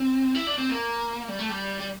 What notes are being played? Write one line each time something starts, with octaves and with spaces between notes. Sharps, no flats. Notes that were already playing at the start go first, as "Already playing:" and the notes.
Already playing: C4
E4
D4
C4
A#3
G3
A3
G3
G3